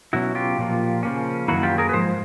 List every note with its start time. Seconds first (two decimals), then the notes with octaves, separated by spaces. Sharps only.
0.13 B2 F#3 A#3 C#4 E4 F#4
0.35 F4 G4
0.58 A#2 F3 A#3
1.03 C#3 F3 A#3 C#4
1.48 F#2 D#3 F#3 A#3 E4 F#4
1.63 F4 G4
1.78 G#4 A#4
1.89 B4
1.93 G#2 F3 C5